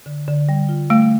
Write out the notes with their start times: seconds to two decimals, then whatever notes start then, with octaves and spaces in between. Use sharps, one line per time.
0.06 D3
0.28 D3
0.49 G3
0.69 F4
0.90 G3 A3